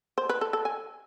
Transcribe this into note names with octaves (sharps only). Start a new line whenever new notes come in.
C5
B4
A4
A4
G#5